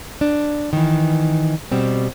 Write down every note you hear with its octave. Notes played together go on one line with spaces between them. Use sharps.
D4
D#3 E3
B2 G3 C4